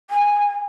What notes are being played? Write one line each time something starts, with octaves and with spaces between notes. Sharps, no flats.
G#5